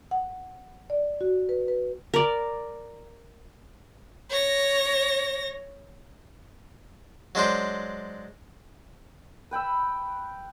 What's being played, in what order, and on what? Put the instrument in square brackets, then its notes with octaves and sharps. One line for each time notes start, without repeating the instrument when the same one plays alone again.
[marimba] F#5
D5
F#4
B4
B4
[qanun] A#4 D5
[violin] C#5 A#6
[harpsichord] F#3 G#3 D4 C5
[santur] B4 G5 B5 E6